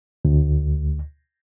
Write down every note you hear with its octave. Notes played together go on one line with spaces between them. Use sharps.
D2